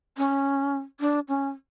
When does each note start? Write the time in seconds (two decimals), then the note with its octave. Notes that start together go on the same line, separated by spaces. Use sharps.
0.18 C#4
1.00 D4
1.28 C#4